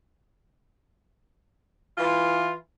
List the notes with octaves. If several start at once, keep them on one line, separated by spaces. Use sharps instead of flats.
E3 F4